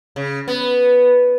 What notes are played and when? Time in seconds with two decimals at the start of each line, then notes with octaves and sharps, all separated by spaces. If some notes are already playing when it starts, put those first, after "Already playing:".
0.16 C#3
0.48 B3